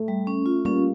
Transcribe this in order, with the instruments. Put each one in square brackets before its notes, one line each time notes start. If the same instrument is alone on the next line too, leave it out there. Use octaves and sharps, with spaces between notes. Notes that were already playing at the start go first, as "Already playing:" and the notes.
Already playing: [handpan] A3
[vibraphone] G3
C#4
F4
[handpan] G3 A#3 [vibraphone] C#4